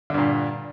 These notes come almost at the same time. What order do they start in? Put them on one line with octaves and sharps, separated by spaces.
D3 G2 A#2